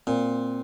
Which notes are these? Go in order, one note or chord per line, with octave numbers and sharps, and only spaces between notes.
A#2 C4